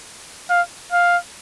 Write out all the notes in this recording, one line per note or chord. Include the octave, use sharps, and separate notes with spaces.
F5
F5